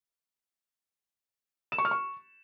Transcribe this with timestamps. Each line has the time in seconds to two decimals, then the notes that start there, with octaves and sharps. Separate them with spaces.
1.72 E7
1.78 C#6
1.85 F6
1.91 C#6